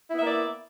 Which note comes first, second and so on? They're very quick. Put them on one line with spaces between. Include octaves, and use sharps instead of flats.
E4 B3 E5 A#3 D5